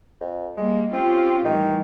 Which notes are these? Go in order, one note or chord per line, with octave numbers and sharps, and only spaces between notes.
F2
G3 G#3 A#3
C4 C#4 F4 G4
A2 D#3 E3 G3